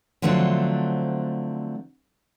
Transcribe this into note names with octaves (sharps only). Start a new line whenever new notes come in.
D3 F3 F#3 A3 C4 D4